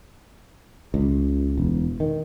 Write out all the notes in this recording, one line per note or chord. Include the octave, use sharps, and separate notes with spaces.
C#2
E1
D#3